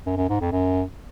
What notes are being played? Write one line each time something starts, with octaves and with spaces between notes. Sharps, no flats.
F#2
F#2
G#2
F2
F#2